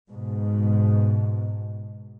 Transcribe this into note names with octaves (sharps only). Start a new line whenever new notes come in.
G#2 B2